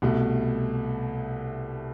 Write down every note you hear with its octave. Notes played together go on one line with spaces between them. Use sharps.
C2 B2 A3